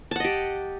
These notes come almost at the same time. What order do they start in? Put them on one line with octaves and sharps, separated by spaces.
A5 F#5 D#5 G4